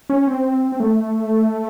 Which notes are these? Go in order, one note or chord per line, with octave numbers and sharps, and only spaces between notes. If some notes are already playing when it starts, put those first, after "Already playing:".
C#4
C4
C4
A3